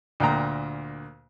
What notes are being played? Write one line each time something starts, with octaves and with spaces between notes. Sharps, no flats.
D2 A#2 G5 A#5